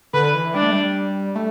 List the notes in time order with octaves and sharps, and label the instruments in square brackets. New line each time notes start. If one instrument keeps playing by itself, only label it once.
[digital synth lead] D3 [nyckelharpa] B4
[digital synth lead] E3
[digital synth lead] G3 [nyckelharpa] D4
[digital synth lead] A3
G3
A3